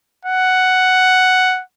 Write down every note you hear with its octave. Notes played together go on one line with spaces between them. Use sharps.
F#5